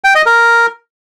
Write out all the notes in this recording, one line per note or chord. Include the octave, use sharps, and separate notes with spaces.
G5
D#5
A#4